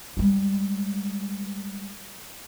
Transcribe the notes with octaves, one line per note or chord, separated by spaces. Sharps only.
G3 G#3